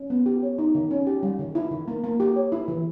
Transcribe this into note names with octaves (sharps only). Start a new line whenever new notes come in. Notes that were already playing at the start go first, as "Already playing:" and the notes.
Already playing: C#4
B3
G4
C#5
D#4
D#3
C#4
G4
G3
D#3
E4
D#3
A#3
A#3
G4
C#5
E4
E3